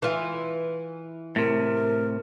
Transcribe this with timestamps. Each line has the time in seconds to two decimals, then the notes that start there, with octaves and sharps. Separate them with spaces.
0.02 E3 F4
1.36 A2 C3 A#4